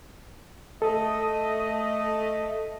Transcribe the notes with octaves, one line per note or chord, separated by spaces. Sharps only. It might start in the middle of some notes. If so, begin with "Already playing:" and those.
A3 A4 D#5